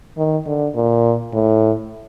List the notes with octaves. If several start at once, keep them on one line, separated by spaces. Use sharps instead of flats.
D#3
D3
A#2
A2